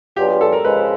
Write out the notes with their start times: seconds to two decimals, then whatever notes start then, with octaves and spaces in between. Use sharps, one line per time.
0.16 F#3 B3 D4 F4 G4 G#4
0.28 G4
0.41 A4
0.52 A#4
0.64 C#3 F3 G#3 B4